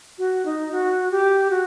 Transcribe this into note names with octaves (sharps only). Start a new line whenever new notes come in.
F#4
D#4
F#4
G4
F#4